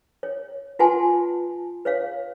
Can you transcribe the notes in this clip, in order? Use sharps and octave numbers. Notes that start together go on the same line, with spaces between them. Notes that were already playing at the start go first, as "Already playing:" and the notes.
C#5
F4 B4 F#5 G#5 A5 C6
B4 C#5 F5